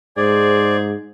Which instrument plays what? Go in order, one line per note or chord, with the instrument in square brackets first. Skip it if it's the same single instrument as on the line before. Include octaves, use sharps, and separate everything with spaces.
[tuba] G#2 [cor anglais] G#4 [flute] C5 [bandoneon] D5